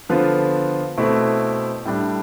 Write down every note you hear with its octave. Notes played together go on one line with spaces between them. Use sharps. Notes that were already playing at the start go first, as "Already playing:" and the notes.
D3 F3 B3 F4
B2 A3 C4 E4
A2 G3 D4